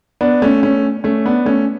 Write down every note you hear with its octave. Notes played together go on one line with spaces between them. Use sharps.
B3 D4
A3 C#4
A3 C#4
A3 C#4
B3 D4
A3 C#4